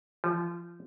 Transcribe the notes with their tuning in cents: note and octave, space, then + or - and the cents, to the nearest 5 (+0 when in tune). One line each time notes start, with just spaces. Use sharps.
F3 -25